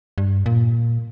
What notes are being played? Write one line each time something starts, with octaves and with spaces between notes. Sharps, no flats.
G2
A#2